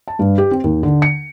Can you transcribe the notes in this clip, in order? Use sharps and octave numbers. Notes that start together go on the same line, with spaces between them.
A5
G2
G4
C4
D#2
D3
C#7